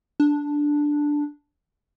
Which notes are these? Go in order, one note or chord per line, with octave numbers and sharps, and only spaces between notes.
D4